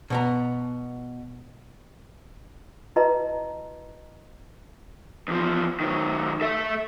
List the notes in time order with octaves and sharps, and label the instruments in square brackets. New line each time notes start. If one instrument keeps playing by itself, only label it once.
[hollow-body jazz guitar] B2 B3 A#5
[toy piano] E4 F#4 B4 D#5 A5 A#5
[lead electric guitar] E2 F3
D#3 F#3
A4 E5